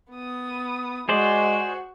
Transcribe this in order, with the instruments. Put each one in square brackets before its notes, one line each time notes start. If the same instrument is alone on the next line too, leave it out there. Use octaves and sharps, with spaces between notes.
[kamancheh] B3 D#6
[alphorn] G#3 [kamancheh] F#4 [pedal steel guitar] G#4 C5 D5